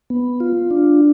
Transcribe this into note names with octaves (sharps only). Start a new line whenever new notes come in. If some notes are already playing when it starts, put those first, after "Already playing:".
B3
F4
D4